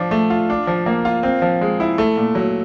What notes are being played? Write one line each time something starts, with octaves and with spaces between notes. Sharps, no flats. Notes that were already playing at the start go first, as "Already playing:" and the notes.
Already playing: F3 D4
A3
F4
D4
F3
A#3
F4
C4
F3
G#3
E4
A3
A#2
F#3